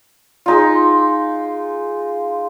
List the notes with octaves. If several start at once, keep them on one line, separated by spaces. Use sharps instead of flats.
G#3 D#4 F4